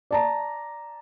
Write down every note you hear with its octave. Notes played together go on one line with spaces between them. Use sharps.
D5 A5 A#5